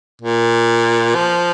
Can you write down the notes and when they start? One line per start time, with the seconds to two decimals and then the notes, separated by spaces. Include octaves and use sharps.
0.21 A#2
1.15 F3